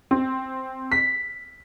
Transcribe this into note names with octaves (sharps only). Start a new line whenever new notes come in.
C4
B6